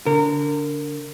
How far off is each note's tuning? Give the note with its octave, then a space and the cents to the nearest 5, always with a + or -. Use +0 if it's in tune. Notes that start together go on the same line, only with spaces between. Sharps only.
D3 -20 A#4 -25